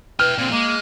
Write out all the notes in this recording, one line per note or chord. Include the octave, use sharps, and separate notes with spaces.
E4 B4 G5 F6
A#2 D3 C4
G#3 A#3